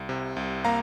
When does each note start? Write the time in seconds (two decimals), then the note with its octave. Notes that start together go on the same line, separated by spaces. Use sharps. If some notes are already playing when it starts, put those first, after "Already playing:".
Already playing: C2
0.09 C3
0.36 C2
0.64 A#3 F5 A#5